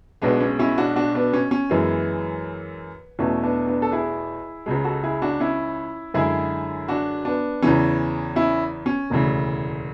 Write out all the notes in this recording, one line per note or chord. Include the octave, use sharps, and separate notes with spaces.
B1 B2 G#3 B3 D4
C#4
C#4 E4
D4 F#4
D4 F#4
B3 D4
C#4
C#4
F#2 E3 G#3 B3
E2 B2 A3 C#4
B3 D4
B3 D4
A4
E4 G#4
C#2 C#3 G#3
F#4 A4
E4 G#4
D4 F#4
C#4 E4
F#2 D3 G#3 E4 G#4
D4 F#4
B3 D4
E2 C#3 E3 C#4
C#4 E4
C#4
E1 D2 C#3 E3